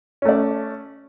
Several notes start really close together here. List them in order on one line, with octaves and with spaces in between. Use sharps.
C#4 A3 D5